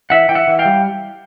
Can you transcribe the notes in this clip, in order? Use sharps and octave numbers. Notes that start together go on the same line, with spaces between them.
E3 E5 F#5
E3 G5
E5 F#5
E3
F5 G5
G3